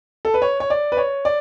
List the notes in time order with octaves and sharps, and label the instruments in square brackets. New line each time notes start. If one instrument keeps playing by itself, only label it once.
[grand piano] A4
B4
C#5
C#5
D5
B4
C#5
D5